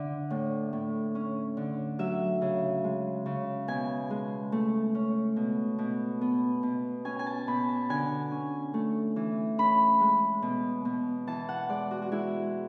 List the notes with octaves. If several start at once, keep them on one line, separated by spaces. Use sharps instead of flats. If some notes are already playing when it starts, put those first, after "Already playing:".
Already playing: D3 D5 E5
A2
A2
C#4
D3
F#3 E5
C#3
G#3
C#3
B2 G#5
G#3
A3
C#4
B2
B2
B3
B2
C#4 G#5
G#5
A5
B2 B5
A5
D3 G#5
C#4
A3
E3
C#4 B5
G#3
B2
B2
E3 A5
F#5
G#3 D5
F#4
F#4
G#3 E4